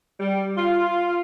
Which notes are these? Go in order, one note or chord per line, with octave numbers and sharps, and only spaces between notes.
G3
F4